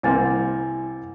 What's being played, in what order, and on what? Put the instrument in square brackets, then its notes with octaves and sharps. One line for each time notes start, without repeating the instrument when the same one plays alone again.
[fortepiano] C2 A#3 C4 [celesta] E4 G#5 A6